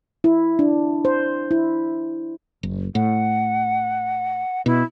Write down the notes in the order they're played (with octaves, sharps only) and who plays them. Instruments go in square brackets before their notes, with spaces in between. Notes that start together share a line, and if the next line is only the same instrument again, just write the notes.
[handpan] E4
D4
C5
E4
[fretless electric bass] F#1
[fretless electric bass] A2 [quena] F#5
[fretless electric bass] B2 [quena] E4